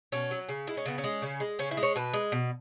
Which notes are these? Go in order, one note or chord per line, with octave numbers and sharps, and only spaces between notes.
B2 C#4
F#3
C#3
G#3 E4
C#4
C#3 B3
C#4
G#3
C#3
G#3
C#3 C#4
E4
G#3
C#5
B2 B4
G#3
B2